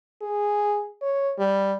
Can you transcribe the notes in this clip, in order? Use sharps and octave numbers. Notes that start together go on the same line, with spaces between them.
G#4
C#5
G3